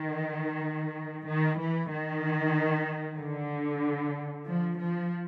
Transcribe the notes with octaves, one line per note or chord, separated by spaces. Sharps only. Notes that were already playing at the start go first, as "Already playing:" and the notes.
Already playing: D#3
D#3
E3
D#3
D3
F3
F3